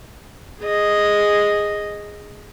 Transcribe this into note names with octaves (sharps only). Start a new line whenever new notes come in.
G#4 D#5